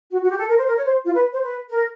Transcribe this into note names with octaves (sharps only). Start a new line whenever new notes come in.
F#4
F#4
G4
A4
A#4
C5
A#4
C#5
C5
F4
B4
C5
B4
A#4